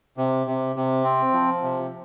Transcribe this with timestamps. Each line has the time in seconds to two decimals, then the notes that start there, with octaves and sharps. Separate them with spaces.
0.17 C3
0.47 C3
0.76 C3
1.04 C4
1.33 F3
1.63 C3